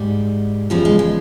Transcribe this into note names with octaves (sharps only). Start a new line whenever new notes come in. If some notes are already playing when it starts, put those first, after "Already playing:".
Already playing: G#2 G3
E2 C#3 F3 G3
G#3
G#3